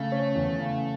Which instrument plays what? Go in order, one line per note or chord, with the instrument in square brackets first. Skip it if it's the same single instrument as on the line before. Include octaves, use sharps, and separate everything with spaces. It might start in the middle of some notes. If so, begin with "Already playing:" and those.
Already playing: [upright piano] C#3 [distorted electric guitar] A3
[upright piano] C#4
E2
C#3